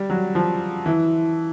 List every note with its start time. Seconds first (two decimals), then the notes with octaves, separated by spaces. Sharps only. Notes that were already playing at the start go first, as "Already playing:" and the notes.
Already playing: G3
0.10 F#3
0.35 F3
0.86 E3